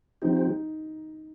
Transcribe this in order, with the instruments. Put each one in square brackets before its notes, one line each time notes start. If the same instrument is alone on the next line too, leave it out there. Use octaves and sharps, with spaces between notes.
[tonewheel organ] F3 C4 G4 [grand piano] D#4